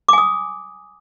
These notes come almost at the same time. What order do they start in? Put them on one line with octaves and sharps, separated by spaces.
D6 G#5 D#6